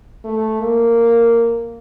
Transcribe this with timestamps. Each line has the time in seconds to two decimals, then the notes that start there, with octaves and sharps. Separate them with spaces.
0.25 A3
0.60 A#3